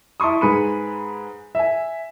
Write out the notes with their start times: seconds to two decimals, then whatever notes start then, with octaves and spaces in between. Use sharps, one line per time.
0.20 E4 A5 C6 C#6 D#6
0.41 G#2 G#4 B4 B5 C#7 D#7
1.55 E5 G#5